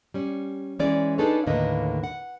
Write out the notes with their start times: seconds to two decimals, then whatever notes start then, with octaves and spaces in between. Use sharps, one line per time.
0.14 G3 C#4
0.79 E3 G#3 C#4 G#4 D5
1.18 D4 D#4 G#4 A4 B4 C#5
1.47 D#2 A2 D3 A#3 B4 D#5
2.04 F#5